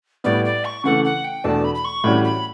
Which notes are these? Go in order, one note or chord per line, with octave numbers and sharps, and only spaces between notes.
A2 G3 B3 D5
D5
C#6
C#3 E3 A3 F#5
F#5
G5
E2 B2 A3 D4 A5
B5
B5
C#6
A2 E3 G3 C#4 F#4 B5
B5